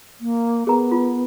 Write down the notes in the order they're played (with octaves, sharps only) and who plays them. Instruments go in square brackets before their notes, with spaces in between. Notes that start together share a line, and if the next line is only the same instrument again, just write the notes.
[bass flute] A#3
[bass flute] B3 [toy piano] G#4 A#4 A#5
[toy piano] F4